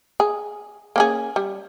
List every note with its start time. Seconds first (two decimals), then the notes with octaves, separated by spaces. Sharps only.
0.20 G#4
0.96 A#3 C#4 G#4
1.36 G3